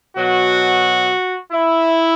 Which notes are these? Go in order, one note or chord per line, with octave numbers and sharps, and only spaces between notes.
B2 F#3 F#4
E4